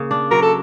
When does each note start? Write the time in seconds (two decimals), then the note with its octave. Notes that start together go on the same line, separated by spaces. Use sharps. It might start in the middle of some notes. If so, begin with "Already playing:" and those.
Already playing: C#3 A#3
0.11 D4
0.31 F#3 A#4
0.42 A4